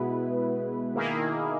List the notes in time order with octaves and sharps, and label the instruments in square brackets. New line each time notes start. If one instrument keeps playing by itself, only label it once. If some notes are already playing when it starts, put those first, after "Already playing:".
Already playing: [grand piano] B2 [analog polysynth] G#3 B3 E4 B4
[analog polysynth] D#3 A#3 E4 G#4